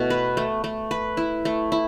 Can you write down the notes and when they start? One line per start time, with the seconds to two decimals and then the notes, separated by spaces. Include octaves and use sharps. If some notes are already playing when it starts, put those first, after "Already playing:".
Already playing: B2 A3 E4
0.10 B4
0.37 A3
0.64 A3
0.91 B4
1.17 E4
1.45 A3
1.72 E4